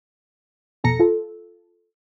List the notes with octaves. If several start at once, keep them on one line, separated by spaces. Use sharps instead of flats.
F2 B2 A4 A#5 A#6 C#7
F4 A4